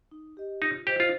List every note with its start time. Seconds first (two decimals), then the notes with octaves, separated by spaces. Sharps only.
0.11 D#4
0.37 G4 D#5
0.61 D#4 F4
0.87 G4 C5 D#5
1.00 F4